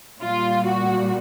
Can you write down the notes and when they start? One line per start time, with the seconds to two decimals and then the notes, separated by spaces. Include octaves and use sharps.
0.21 A#2 G3 F4
0.66 F#4